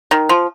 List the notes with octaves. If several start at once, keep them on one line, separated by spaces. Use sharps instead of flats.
D#3
F3